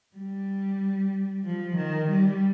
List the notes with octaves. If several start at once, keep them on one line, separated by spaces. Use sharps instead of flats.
G3
F3
D#3
G3